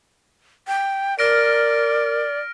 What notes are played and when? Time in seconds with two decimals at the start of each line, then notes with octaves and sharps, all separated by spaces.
0.67 G5
1.19 A#4 D5 F6 A#6 D7